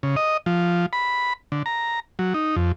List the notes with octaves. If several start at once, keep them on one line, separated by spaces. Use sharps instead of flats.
C#3
D#5
F3
B5
D3
A#5
F#3
D#4
F2